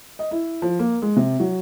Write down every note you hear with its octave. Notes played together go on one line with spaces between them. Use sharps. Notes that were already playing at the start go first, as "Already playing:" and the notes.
D#5
E4
F3
A#3
G#3
C3
F#3